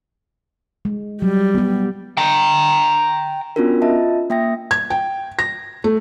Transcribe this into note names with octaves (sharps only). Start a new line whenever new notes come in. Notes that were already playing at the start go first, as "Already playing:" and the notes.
G#3
F#3 G3
B3 G4
G5 A#5
B3 C#4 D4 F4 F#4 A#4
F4 D#5 E5 A5
A#3 E5 G5 D#6 A#6
G#6
G5
A#6
A3